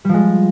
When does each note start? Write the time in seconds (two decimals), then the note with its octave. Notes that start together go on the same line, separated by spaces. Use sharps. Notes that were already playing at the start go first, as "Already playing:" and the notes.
0.05 G3
0.09 F3
0.14 G#3